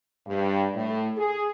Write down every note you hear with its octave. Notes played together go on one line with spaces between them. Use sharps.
G2
A2
G#4